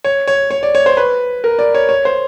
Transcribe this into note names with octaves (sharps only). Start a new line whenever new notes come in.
C#5
C#5
C#5
D5
C#5
C5
B4
A#4
D5
C#5
C#5
C5